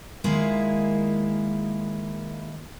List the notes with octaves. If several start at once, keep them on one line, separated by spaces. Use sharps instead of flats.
D#3 G#3 A#3 E4 F4 G#4